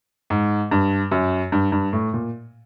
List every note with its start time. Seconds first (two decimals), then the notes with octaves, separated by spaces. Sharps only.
0.30 G#2
0.71 G2
1.12 F#2
1.52 G2
1.72 G2
1.93 A2
2.13 A#2